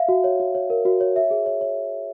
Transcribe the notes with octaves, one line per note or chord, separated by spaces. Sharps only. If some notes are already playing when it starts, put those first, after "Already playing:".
Already playing: E5 F5
F#4
C#5
F#4
C#5
A#4
F#4
C#5
E5
G#4
C#5
C#5